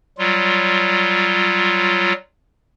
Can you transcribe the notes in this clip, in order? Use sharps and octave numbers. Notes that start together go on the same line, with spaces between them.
F#3 G3 F4